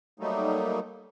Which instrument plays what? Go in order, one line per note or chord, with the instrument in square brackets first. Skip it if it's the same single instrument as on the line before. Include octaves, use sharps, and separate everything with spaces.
[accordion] F#3 G3 A3 A#3 D#4